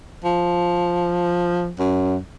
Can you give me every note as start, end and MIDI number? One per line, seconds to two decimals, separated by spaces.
0.24 1.72 53
1.79 2.18 42